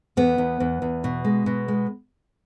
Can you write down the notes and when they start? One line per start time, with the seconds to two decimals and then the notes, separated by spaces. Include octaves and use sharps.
0.17 E2 B3
0.38 E2
0.60 E2
0.82 E2
1.04 B2
1.24 G#3
1.46 B2
1.68 G#3